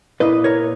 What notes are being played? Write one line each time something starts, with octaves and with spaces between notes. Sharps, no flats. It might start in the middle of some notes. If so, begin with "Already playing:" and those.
A#2 A#3 E4 B4 D#5
A#4 C#5